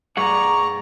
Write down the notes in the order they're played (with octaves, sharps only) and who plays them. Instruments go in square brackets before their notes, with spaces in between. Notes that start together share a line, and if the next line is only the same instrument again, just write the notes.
[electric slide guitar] G2 G#4 F#5 [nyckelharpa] D5 A#5 [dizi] C#6